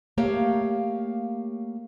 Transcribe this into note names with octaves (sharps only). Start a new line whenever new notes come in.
A3 A#3 G4 C#5 F5